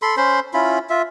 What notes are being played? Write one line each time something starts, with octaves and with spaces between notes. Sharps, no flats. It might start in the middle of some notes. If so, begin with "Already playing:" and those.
A4 B5 C6
C#4 C5 B5 C6
C#4 E4 F4 B5
F4 E5